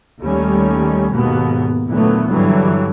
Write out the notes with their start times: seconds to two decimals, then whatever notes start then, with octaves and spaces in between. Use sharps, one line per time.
0.21 D#2 D#3 G3 A3 C#4
1.13 D#2 G#2 B2 A#3 B3
1.91 A#2 D3 E3 F#3 A3 B3
2.30 G2 D3 E3 F#3 G3